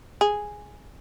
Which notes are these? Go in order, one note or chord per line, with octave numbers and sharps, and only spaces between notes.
G#4